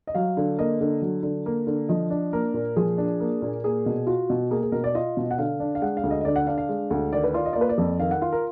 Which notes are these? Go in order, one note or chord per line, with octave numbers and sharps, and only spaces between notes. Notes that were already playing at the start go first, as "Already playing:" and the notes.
D#5
F#3 F5
D3
A#3 D#5
D3
F#3
D3
A#3
D3
F3 D#5
D4
A#3 A#4
A#2
F3 G#4
D4
A#3
A#2
A#3 G#4
B2
F4 F#4
B2
A#3 G#4
G#4
B2 A#4
D5
F4 D#5
B2
F#5
D3 F5
D4
F5
G#3 F#5
F5
D2
D#5
D#5
D3 D5
F#5
D4 F5
F5
G#3
D2
D#3 D5
B4
F4 D5
D#5
A#3 D5
B4
D5
F2
D#3 F5
F#5
F4 F5
A#4